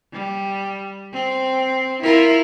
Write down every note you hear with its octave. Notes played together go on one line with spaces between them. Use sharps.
G3
C4
E4 F4 A#4